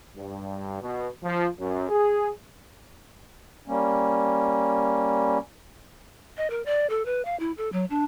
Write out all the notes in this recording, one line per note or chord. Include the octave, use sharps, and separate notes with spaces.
G2
B2
F3
F#2
G#4
G3 A#3 C#4
D#5
A#4
D5
A4
B4
F5
E4
A4
F#3
D4